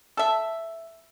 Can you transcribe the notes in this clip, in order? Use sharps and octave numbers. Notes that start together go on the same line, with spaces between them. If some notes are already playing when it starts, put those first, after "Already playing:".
A4 E5